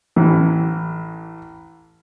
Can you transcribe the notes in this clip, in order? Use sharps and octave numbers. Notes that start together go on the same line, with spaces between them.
A1 E3